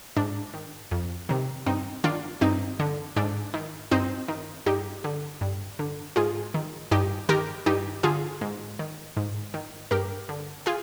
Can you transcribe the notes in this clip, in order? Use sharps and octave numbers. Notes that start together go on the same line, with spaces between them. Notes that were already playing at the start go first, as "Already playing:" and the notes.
G#2 D4
D#3
F2
C3 D#3
G2 C4 D#4
D#3 D4 F4
G2 C4 D#4
D3
G#2 D4
D#3
G2 C4 D#4
D#3
G2 D#4 G4
D3
G2
D3
G#2 F4 G#4
D#3
G2 D#4 G4
D#3 G4 A#4
G2 D#4 G4
D3 F4 G#4
G#2
D#3
G#2
D#3
G2 G4 A#4
D3
F4 G#4